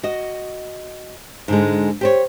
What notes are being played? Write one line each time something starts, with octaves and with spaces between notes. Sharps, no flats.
F#4 D#5
G#2 D3 G#3
G4 C5 C#5